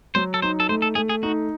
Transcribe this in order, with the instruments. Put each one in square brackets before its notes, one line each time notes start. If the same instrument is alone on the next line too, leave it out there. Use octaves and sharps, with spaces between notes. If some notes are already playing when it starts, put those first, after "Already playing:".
[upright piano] F#3 [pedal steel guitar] C5
[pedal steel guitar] A4
[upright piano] D#4 [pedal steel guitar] C5
[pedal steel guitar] A4
[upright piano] A3 [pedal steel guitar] C5
[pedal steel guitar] A4
[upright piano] A3 [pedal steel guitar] G#4
[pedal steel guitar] G#4
[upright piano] D#4 [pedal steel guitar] F#4